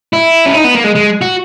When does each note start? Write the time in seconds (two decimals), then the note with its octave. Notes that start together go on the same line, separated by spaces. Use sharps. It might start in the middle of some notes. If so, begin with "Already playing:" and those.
0.13 E4
0.46 C#4
0.54 D#4
0.64 B3
0.75 A#3
0.84 G#3
0.95 G#3
1.21 F#4